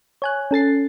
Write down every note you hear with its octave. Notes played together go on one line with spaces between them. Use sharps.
C#5 G#5 F#6
C#4 A4 A6 C7